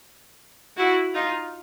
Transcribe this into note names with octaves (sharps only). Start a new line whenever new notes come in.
E4 F#4
D#4 F4